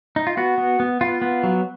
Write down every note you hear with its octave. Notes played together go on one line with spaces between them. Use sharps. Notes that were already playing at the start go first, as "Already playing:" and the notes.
D#4
F4
B3 F#4
B3
B3
B3 F4
B3
F#3